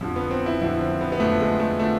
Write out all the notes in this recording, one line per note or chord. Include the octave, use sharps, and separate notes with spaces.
F2 D3 F3
B3
C4
E4
F2 D3 F3 E4
C4
B3
B3
F2 D3 F3 A3
G#3
A3
D3 F3 A3